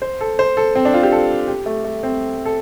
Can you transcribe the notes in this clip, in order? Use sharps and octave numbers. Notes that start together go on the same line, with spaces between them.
C5
A4
C5
A4
C4
D4
F4
G4
A4
G4
A3
A3
C4
A4